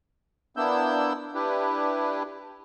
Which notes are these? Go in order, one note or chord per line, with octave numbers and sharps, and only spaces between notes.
A#3 B3 D4 E4 E6 G6
D4 E4 G4 B4